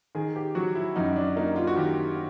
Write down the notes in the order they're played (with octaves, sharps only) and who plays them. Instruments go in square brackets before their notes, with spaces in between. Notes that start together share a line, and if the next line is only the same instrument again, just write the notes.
[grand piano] D#3 G#4
G4
F#3 F#4
E4
F#2 D#4
D4
A#3 D#4
F4
F#4
D#3 G4